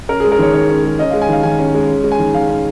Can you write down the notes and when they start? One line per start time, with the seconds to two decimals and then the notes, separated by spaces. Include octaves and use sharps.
0.09 C#4 A#4
0.20 G#4
0.24 G#3
0.32 A#4
0.39 D#3 C#5
0.53 D#3 C#5
0.69 C#4
0.84 G#3
0.99 C#4 D#5
1.11 G#3 F5
1.22 G#5
1.29 D#3 F5
1.43 D#3 G#5
1.58 C#4
1.74 G#3
1.89 C#4
2.04 G#3
2.12 G#5
2.19 D#3
2.33 D#3 F5
2.49 C#4